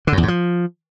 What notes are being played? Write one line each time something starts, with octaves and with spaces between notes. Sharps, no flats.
D3
F#2
E2
G#2
F3